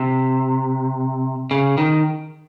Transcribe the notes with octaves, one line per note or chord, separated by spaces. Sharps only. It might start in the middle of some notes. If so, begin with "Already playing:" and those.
Already playing: C3
C#3
D#3